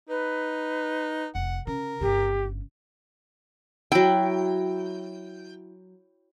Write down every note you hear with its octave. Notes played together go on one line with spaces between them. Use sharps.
D#4 B4
F1 F#5
C#3 A#4
G1 C#3 G4
F#3 E4 G5